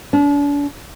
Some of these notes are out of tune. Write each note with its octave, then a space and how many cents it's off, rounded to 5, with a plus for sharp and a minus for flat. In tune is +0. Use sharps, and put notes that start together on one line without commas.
D4 -40